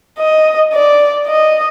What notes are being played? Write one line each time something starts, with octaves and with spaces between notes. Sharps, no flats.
D#5
D5
D#5